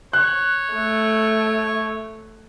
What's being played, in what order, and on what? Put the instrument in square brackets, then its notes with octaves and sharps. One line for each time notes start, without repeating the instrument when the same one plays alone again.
[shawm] C#5 [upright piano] F#6
[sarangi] A3